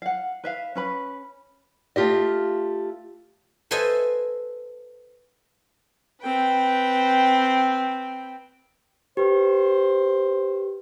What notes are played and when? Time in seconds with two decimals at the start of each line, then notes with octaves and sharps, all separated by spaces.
0.02 F5 F#5
0.44 B4 E5 F5
0.75 C#4 B4 B5
1.96 A3 F4 G4 D#5
3.71 A4 B4 C5 D#5 E5 G#5
6.21 C4 B4 G5
9.17 G4 B4 C5